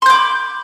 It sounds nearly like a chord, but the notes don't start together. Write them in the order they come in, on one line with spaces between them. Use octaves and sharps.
C6 G6 D6 B5